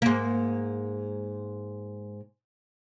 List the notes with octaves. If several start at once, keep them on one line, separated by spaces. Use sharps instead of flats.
G#2 A#3